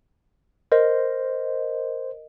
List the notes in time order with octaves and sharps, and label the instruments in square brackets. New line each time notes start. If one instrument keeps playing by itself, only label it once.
[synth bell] A#4 D#5 [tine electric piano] C5